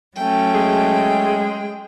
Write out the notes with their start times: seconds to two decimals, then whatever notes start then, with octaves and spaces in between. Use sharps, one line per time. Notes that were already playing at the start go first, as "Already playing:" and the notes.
0.16 F#3 A3 C#4 G5
0.54 G#3 G#4